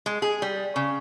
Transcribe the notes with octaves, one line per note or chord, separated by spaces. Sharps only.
G#3
G#4
G3
C#3